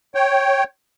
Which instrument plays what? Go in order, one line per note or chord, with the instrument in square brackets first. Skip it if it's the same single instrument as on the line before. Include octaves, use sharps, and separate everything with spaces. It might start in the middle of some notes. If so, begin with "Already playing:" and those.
[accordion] C#5 G5